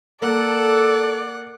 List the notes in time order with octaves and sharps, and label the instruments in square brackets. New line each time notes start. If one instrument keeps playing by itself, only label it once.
[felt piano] A#3 [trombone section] A4 [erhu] D5 [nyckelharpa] F#5